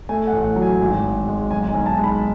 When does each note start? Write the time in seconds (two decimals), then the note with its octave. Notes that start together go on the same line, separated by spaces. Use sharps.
0.09 A3 G#5
0.27 F#5
0.33 A1
0.44 F#5
0.56 F#3
0.62 G#5
0.80 G#1
1.03 G#1
1.27 G#3
1.51 B1 G#5
1.69 G#5
1.74 B1
1.86 A5
1.98 G#3
2.04 B5